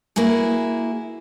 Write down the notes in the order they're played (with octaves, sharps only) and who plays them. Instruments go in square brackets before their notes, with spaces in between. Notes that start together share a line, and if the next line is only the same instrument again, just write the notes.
[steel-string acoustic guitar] A#3 E4 F#4 G#4